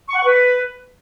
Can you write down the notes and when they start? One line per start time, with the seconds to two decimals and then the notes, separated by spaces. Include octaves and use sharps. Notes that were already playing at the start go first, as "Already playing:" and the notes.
0.09 C#6
0.15 F#5
0.20 C#6
0.26 B4